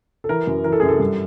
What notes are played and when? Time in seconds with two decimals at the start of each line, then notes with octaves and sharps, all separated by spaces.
0.24 A4
0.29 E3 A#4
0.47 F#2
0.64 E3 A#4
0.72 A4
0.80 G#4
0.83 F#2
0.88 A4
1.00 G2